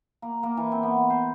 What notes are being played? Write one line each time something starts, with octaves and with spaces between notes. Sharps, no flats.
A#3
A#3
E3
C4
B3
C5